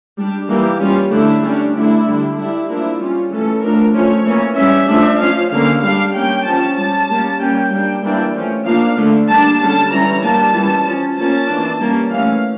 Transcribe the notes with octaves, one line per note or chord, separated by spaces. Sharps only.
G3 D4 G4
E3 G3 A#3 G4
G3 C#4 F4
D3 A3 D4 E4
G3 C#4 D4
D3 A3 D4 E4
D3 G3 D4
G3 D4 E4
F3 A#3 D4 E4
G3 C#4 F4
E3 A3 C#4 A4
F3 A3 D4 A#4
F3 A3 C#4 C#5
E3 A#3 C#4
G3 C#4 E5
F3 A3 D4 E5
F3 C#4 F5
D3 G3 A#3 C#4 F5
G3 D4 F5
G3 A#3 C#4 G5
F3 C#4 A5
G3 C#4 A5
G3 A#3 C#4
G3 A#3 C#4 G5
G3 A#3 D4 G5
E3 G3 A#3 D4
F3 A3 C#4
F3 A#3 D4 F5
D3 A3 D4
G3 A#3 D4 A5
D3 G3 C#4 A5
E3 G3 C#4 A#5
G3 A#3 D4 A5
E3 G3 C#4
F3 C#4
F3 A#3 C#4 A5
E3 A#3 D4
G3 A#3 C#4
E3 A3 C#4 F5